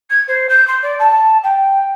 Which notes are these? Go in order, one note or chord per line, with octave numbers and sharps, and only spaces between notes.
G#6
C5
G6
C6
D5
A5
G5